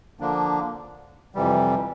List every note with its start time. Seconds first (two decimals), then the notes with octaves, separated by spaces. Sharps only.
0.20 D3 F3 A#3 D4
1.35 F2 C3 E3 G3